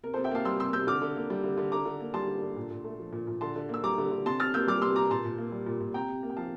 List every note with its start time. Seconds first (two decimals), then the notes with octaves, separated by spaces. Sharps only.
0.03 C3 A#4
0.14 C3 A4 C5
0.24 E5 G5
0.31 A#3 F5 A5
0.45 G3 C6 E6
0.59 C3 C6 E6
0.73 C3 E6 G6
0.87 D3 D6 F6
1.02 D3
1.16 A#3
1.30 G3
1.44 D3
1.58 D3
1.72 D3 A#5 D6
1.86 D3
2.00 A#3
2.14 G3 A5 C6
2.28 D3
2.42 D3
2.56 A#2
2.71 A#2
2.84 A3
3.00 F3
3.12 A#2
3.27 A#2
3.41 D3 A5 C6
3.56 D3
3.69 A#3 E6
3.83 G3 A#5 D6
3.98 D3
4.12 D3
4.26 C3 A5 C6
4.40 C3 F6 A6
4.54 A#3 E6 G6
4.67 G3 D6 F6
4.82 C3 C6 E6
4.96 C3 A#5 D6
5.10 A#2 A5 C6
5.25 A#2
5.38 A#3
5.52 G3
5.66 A#2
5.81 A#2
5.94 C3 G5 A#5
6.09 C3
6.23 A#3
6.30 G5
6.37 F3 F5 A5